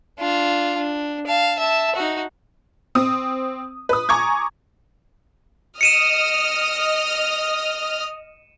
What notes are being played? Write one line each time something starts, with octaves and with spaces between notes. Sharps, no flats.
D4 F4
D4
F5 A5
E5 A5
D#4 F#4
C4 D#6
B4 D#6
G#5 A#5 C#6 D6 G#6
D#5 D#6 F6 C#7 D#7 E7